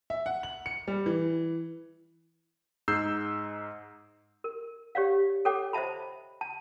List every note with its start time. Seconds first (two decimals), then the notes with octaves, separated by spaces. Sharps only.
0.10 E5
0.26 F#5
0.43 F#7
0.66 C#7
0.88 G3
1.06 E3
2.88 G#2 D#4 G#4 E6 G6 C7
4.44 A#4
4.95 G4 C#5 D5 F5
5.45 A4 C#5 G5 D6
5.73 C5 D#5 E5 A5 B5
6.41 A5